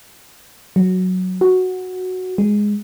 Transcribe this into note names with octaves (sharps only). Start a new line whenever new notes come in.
F#3
F#4
G#3